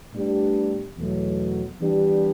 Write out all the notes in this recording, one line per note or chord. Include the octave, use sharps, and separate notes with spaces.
A2 G3 B3 D4 G4
E2 B2 F#3 A3
E3 G3 B3 D4 G4